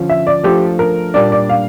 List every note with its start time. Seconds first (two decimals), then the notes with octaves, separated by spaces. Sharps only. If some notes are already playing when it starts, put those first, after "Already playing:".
Already playing: D3 F3 C#4 F4
0.09 E5
0.27 D5
0.44 F3 A3 D4 G4 A4
0.79 A#4
1.14 A#2 G3 A#3 D4 D5
1.32 D5
1.49 F5